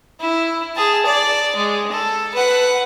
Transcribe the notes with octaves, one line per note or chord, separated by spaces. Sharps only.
E4
G#4 A5
D5
G#3
A4
B4 F#5